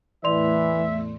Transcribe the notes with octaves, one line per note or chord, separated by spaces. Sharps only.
E2 A2 E3 A3 D5 E5 C6 F7